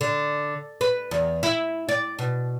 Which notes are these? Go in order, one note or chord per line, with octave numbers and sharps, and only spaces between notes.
D3
B4
E2
E4
D5
B2